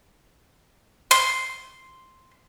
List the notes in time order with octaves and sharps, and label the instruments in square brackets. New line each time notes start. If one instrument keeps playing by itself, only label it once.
[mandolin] C6